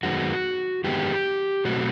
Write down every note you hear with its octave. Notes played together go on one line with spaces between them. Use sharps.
F#2 D#3 G#3 B3 F#4
F#2 D#3 G#3 B3 G4
B2 F#3 A3 C4 F#4